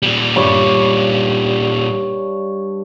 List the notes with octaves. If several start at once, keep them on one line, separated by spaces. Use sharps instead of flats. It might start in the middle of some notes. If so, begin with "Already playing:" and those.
A#2 G3
G2 C#5